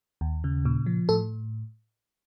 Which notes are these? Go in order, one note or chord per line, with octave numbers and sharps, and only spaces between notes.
D#2
C#3
A#2
F3
A2 A4